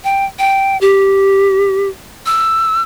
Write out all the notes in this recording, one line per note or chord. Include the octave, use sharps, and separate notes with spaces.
G5
G5
G4
E6